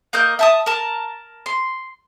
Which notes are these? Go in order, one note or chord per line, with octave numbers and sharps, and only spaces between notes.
A#3 A#4 D#5 G6
E5 A5 D#6
A#4 A5
C6